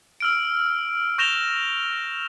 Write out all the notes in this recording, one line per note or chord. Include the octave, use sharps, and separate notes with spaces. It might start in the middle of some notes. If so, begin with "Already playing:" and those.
E6 F6 D7
C#6 G6 A#6 E7 F7 G7